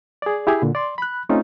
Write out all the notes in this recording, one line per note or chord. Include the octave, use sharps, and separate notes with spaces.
G#4 D5
E4 G4 G#4 G#5 B5
A#2 D3
D5 C6
B5 F#6
A3 C4 C#4 D#4 F4